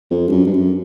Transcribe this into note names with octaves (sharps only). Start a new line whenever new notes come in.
F2
G2
F#2
G2
F#2